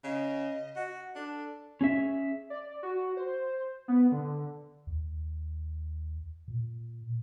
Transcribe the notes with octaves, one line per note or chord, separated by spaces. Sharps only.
C#3 D#5
F#4
D4 A4
C#4 G#4 E5
D5
F#4
C5
B3
D3
D#2
A#2